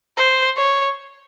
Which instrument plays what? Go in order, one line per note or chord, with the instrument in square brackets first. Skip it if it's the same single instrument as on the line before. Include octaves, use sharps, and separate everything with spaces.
[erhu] C5
C#5